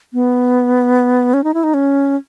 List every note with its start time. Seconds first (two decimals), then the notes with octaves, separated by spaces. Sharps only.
0.13 B3
1.34 C#4
1.44 D#4
1.54 E4
1.63 D#4
1.74 C#4